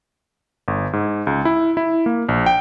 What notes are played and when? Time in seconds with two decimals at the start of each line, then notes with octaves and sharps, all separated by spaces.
0.68 G1
0.93 G#2
1.27 C#2
1.45 E4
1.77 E4
2.06 A#3
2.29 A#1
2.46 G5